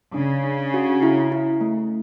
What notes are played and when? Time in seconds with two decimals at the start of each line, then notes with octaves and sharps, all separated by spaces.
0.14 C#3 D4
0.44 D4
0.74 F#4
1.02 E4
1.32 E4
1.61 A3